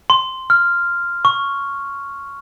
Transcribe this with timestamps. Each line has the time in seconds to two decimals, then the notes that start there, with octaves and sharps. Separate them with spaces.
0.10 C6
0.50 F6
1.25 C#6